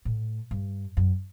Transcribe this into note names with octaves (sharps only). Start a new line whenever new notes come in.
A2
G2
F#2